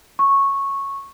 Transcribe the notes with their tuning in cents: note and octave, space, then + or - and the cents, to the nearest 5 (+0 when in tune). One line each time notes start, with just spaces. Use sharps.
C#6 -10